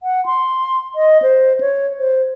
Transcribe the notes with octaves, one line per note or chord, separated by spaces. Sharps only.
F#5
C6
D#5
C5
C#5
C5